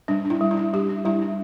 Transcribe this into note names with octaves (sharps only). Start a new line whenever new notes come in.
G3 D4
D4
E4
G3
E4
D4
G3 G4
D4
G3 E4
D4